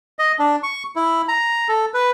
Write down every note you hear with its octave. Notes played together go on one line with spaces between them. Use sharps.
D#5
D4
C#6
E4
A#5
A4
B4